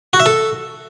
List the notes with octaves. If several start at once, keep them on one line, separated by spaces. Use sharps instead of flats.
F#4
E5
A4